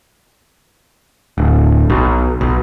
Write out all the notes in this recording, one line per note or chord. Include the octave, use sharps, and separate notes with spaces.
D1
B1
B1